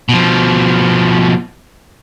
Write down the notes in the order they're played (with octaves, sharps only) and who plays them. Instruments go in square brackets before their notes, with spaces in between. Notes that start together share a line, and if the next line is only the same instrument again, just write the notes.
[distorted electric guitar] B2 F3